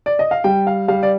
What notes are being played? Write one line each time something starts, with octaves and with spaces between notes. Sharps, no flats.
D5
D#5
F5
G3 G5
F5
G3 F5
D5